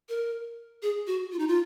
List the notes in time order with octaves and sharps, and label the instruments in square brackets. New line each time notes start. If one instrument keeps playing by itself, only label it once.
[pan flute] A#4
G#4
F#4
F4
D#4
F4